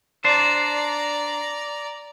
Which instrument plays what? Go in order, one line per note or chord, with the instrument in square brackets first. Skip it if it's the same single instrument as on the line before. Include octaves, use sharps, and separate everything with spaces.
[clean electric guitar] D4 C5 [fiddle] D5 A#5